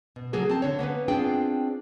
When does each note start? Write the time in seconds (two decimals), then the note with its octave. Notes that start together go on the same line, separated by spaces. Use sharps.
0.16 B2
0.33 C#3 F#3 A#3 G#4 A4
0.49 C4 A5
0.62 D3 C#5
0.79 A#3 B3 C#4 B4
1.08 B3 C4 D4 F4 G#4 G5